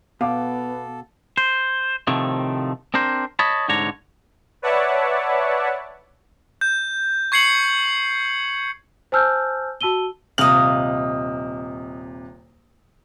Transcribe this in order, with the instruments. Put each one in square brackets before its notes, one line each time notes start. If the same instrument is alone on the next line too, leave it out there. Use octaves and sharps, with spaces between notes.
[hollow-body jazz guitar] B2 [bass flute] B3 [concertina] A4 [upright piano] F5 D6
[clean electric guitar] C5
A2 C3 D#3 F3 A3
C4 D4 A#4 C5
C#5 D#5 A5 B5
C2 G#2 D3 D4 C#5 A#5
[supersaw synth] B4 C#5 D5 E5 F#5 A5
[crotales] G6
C#6 G#6 C7 C#7 F#7
[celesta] C5 G#5 A5 E6 F6 G6
F#4 A5 E6 D#7 G7
[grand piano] D#1 C3 F#7 [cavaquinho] D#5 F5